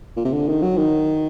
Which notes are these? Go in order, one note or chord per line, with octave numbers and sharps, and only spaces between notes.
A#2
C3
D3
D#3
F#3
D#3